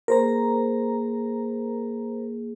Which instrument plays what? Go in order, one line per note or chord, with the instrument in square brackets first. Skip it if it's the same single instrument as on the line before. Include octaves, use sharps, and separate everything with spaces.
[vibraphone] A#3 G#4 [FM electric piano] A#4 C5 A#5